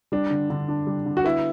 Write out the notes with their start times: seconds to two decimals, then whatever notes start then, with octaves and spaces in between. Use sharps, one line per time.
0.12 G3 D4
0.30 D3
0.50 D3
0.68 D4
0.87 G3
1.06 D3
1.17 F#4
1.24 B3 E4